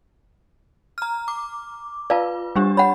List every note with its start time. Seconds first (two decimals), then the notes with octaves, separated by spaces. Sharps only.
0.98 A#5 F6
1.28 D6
2.10 F4 B4 D5 F5 A5
2.56 G3 D4 G4
2.77 C#5 F#5 B5